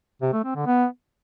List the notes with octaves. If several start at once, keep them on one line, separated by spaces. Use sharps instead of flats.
C3
A3
C4
D3
B3